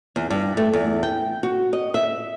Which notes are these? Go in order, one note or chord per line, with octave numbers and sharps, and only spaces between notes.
E2
G2
A3
E2
G5
F#4
D#5
E5